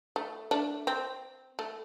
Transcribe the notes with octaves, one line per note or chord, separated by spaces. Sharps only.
A3
A3 D4
C4
A3